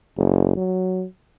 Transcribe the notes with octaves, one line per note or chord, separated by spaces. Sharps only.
F#1
F#3